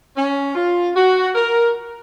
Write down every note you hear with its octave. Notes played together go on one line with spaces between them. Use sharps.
C#4
F4
F#4
A#4